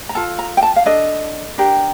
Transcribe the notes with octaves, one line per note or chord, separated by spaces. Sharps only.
A#5
F4 A4 A5
A#5
G5
A5
F5
D4 A4 D#5
D4 G4 A#4